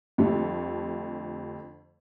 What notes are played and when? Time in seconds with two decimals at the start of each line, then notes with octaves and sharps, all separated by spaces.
0.18 F2 D3 G3 A3